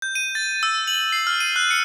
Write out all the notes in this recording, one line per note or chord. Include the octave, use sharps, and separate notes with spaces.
G6
D#7
A6
E6
F#7
C7
F6
D#7
F#6
C#7